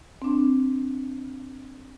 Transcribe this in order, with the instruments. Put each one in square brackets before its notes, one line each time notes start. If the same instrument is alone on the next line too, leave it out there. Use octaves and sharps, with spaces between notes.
[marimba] C4 D4